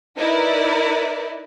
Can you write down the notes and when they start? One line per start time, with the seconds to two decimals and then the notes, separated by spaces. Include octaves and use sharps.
0.18 D#4 E4 A#4 B4 D5